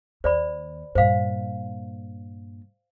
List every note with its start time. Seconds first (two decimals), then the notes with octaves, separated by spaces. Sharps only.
0.24 D#2 C5 D5 B5
0.95 G2 A#2 C5 F5